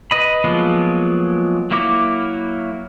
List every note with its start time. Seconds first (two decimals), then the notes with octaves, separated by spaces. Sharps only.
0.11 B4 D#5 B5
0.44 F3 F#3 G#3 A#3 B3
1.71 F#3 A#3 E4 F#4 D6